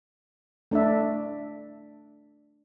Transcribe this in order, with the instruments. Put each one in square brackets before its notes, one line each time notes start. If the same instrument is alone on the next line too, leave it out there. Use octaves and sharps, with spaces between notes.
[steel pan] A3 D4 D5 E5